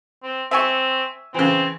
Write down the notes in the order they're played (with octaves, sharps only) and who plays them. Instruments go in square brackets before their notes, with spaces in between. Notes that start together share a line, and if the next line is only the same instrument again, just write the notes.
[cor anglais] C4
[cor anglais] C4 [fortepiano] E5 G#5 C#6
[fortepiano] C#3 E3 [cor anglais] C4